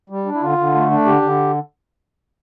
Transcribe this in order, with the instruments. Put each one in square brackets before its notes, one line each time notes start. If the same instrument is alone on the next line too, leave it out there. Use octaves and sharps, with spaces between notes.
[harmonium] G3
D4
E4
D3 F4
D3
A3
D4
D3 G4
D3